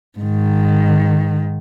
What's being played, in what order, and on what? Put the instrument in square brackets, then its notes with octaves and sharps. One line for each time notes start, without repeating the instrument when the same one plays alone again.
[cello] G#2 D#3